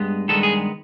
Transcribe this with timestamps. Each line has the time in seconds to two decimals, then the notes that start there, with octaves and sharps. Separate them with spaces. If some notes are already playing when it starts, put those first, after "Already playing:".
Already playing: G2 G#3 B3
0.28 G2 D#3 G#3 B3 A4
0.43 G#4